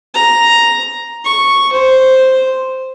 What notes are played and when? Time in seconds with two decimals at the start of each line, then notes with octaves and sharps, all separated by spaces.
0.14 A#5
1.24 C#6
1.72 C5